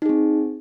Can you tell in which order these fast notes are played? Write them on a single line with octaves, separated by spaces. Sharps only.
D#4 G#4 C4